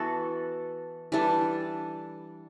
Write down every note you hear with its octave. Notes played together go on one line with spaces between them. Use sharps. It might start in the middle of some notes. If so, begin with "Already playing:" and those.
Already playing: E3 B3 F#4 A4
E3 G3 D4 A4